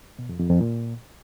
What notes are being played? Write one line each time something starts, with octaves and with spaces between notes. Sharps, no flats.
B2
F2
F2
F2
A#2